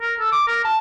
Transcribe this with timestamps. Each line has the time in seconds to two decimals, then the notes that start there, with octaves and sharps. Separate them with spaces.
0.01 A#4
0.19 A4
0.32 D6
0.47 A#4
0.65 A5